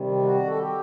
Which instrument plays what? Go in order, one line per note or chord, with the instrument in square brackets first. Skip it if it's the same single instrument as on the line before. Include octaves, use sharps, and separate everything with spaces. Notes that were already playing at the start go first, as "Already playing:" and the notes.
Already playing: [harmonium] C3 D#3 G3
F#4
A4
G4